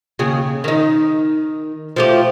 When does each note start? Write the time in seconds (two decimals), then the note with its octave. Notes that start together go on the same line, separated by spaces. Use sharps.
0.19 D#2 C#3 G#4
0.64 D#3 D#4
1.96 F3 A3 G4